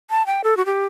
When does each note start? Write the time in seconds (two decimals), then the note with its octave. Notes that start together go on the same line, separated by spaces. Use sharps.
0.10 A5
0.26 G5
0.44 A4
0.57 F#4
0.66 G4